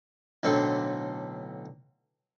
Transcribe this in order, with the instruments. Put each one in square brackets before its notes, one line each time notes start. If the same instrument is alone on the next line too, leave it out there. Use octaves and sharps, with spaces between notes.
[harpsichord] B1 A2 D3 C4 A4